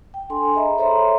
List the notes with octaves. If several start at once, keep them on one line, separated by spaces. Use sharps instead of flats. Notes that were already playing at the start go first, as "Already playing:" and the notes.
G5
D4 A4 G#5 C6
G#4 D#5 E5 A#5 B5
A4 C5 C#5 E5 A#5 C6